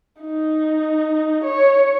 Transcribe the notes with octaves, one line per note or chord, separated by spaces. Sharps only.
D#4
C#5